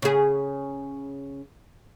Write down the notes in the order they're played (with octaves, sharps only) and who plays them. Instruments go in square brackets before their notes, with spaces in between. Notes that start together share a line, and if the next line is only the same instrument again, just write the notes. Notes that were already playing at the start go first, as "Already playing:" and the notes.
[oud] C#3 G#4